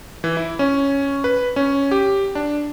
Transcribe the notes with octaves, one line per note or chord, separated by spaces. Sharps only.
E3
E4
C#4
B4
C#4
G4
D4